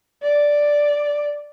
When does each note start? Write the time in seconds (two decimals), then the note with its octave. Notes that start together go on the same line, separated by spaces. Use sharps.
0.22 D5